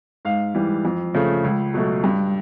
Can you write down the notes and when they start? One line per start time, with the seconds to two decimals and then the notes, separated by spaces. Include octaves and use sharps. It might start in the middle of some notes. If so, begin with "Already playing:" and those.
0.25 G#2 F5
0.55 E3 G3
0.85 F2
1.14 C#3 F3 A3
1.44 C#2
1.74 B2 F#3 A3
2.04 G2